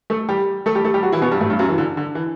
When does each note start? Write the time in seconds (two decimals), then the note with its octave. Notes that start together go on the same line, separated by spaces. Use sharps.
0.10 A3 A4
0.29 G3 G4
0.66 A3 A4
0.75 G3 G4
0.84 A3 A4
0.94 G3 G4
1.03 F#3 F#4
1.12 E3 E4
1.22 B2 B3
1.31 G2 G3
1.41 A2 A3
1.50 G2 G3
1.59 F#2 F#3
1.69 E3
1.78 D3
1.97 D3
2.15 E3